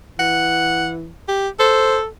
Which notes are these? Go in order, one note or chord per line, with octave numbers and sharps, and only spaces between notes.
E3 F#5
G4
A4 C5